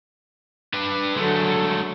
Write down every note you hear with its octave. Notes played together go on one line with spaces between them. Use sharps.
D4 B4
D3 F#3 G#3 A3 A4